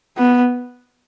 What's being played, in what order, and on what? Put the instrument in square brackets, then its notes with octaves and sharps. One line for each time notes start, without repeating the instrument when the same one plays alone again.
[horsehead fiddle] B3